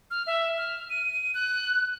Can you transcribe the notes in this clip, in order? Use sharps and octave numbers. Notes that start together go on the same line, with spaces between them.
F6
E5
F6
D#7
D#7
F#6